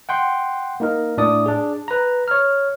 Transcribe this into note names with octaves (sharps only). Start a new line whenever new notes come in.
F#5 G5 C6
A#3 D#4 A#4
A2 D4 D5 D#6
D4 G#4
B4 A#5
C#5 F6